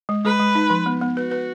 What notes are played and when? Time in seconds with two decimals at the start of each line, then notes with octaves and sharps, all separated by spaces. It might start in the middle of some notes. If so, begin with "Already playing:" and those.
0.09 G#3
0.25 G#3 B4
0.39 G#3
0.55 D#4
0.70 F3
0.86 B3
1.01 B3
1.16 F#4 B4
1.31 B4